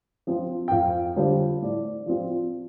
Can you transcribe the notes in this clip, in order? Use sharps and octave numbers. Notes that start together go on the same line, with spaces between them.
F3 C4 F4
G5
F2 F5
D3 G3 D4 F4 C5
A2 D5
F3 C4 F4